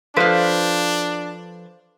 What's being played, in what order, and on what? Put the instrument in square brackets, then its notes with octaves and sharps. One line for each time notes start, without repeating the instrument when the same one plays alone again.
[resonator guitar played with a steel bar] F3 A4 B4 [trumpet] D4 [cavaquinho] C5 F5